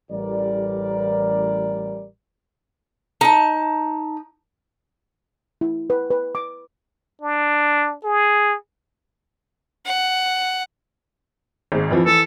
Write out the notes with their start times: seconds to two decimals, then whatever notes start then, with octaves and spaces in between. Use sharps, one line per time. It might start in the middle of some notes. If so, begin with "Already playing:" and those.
0.10 A1 G3 A#4 D5
3.21 D#4 A5
5.61 E4
5.90 B4
6.11 B4
6.35 D6
7.21 D4
8.04 G#4
9.85 F#5
11.72 G#1 G#2
11.91 F2 E3 F3
12.06 E3 A4